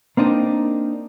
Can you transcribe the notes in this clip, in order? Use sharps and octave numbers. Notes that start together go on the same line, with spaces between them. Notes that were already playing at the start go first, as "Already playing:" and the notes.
A#3 C4 D4 D#4